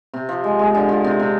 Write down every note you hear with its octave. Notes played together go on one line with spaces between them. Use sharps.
C3
F3
G#3
G#3
D3
F3
C3
C3